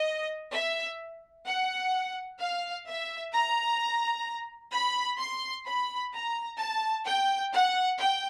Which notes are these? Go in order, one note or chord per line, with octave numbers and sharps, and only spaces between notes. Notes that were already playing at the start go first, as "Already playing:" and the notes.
Already playing: D#5
E5
F#5
F5
E5
A#5
B5
C6
B5
A#5
A5
G5
F#5
G5